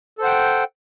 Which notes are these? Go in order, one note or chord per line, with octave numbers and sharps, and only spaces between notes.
A4 C5 F#5 G5